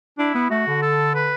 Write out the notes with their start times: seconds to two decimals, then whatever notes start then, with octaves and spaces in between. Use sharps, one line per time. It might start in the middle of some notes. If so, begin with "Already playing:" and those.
0.18 D4 E4
0.34 B3
0.50 A3 F#4
0.67 D3
0.82 A4
1.15 B4